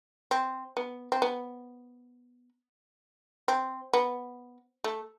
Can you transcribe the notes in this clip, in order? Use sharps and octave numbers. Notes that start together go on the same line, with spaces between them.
C4
B3
C4
B3
C4
B3
A3